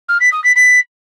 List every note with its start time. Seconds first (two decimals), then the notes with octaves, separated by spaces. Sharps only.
0.09 F6
0.21 B6
0.32 D#6
0.44 B6
0.56 B6